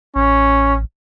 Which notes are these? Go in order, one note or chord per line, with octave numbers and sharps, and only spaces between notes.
A1 C#4